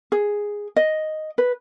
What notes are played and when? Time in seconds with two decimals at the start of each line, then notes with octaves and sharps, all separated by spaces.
0.12 G#4
0.76 D#5
1.38 B4